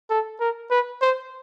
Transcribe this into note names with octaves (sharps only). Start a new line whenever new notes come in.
A4
A#4
B4
C5